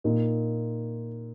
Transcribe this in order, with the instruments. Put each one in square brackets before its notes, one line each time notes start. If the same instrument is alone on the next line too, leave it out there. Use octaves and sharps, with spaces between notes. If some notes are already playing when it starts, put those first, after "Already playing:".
[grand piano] A#2 A#3 D#4